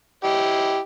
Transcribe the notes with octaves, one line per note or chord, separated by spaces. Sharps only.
E4 G4 D#5